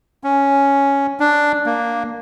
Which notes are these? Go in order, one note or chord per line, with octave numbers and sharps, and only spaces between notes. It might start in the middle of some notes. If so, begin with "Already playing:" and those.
C#4
D4
A#3